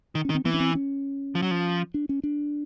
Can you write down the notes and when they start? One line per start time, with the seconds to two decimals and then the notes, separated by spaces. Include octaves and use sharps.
0.15 D#3
0.25 C#4
0.30 D#3
0.35 C4
0.45 E3 B3
0.54 C#4
0.60 C4
0.75 C#4
1.35 F3
1.42 F#3
1.51 F3
1.94 D4
2.09 C#4
2.24 D4